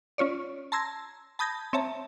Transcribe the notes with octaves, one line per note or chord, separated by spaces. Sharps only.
C#4 F4 C#5 D5
A5 A#5 C6 E6 G#6 A#6
A5 B5 D#6 G6 G#6 A#6
C4 C#5 E5 A5 A#5